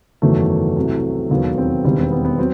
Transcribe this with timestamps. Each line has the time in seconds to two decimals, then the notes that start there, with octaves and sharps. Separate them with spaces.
0.22 F#1 E2 D#3 F#3 A3
0.76 C2 C3 F#3
1.30 E1 D#2 D#3 F#3 B3
1.58 C4
1.84 E1 D#2 D#3 G3 C4
1.98 C4
2.12 B3
2.25 B3
2.38 F#3 C4